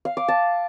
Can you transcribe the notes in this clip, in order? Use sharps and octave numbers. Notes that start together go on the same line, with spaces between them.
F5
D6
A5